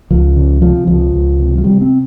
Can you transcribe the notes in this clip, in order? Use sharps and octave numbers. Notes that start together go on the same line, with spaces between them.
C#2 F3
C#3
C3 F3
C#2 F3
C#2
C3
F3
C3 G3
C4